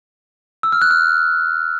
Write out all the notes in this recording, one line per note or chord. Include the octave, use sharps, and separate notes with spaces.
E6
F6
F#6
F6